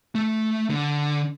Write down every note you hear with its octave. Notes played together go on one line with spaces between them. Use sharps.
A3
D3